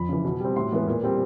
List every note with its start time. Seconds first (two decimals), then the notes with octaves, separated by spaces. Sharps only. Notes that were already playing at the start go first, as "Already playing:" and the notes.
Already playing: F2 B5
0.09 C#3 E3
0.25 B2
0.40 G3 C4
0.56 A2 C6
0.72 E3 G#3 B3
0.88 A#2
1.03 G3 C4